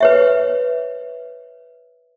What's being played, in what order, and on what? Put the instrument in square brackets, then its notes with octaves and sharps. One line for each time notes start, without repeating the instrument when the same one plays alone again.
[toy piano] B4 C#5 E5